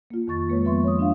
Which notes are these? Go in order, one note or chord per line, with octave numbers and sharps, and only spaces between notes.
A#3 F4
F2 D#3 C#6 A6
G#3 A#3 B4 C#5
F3 B3 E5 C6 C#6
C#5 D#6
D4 F4 E5 F5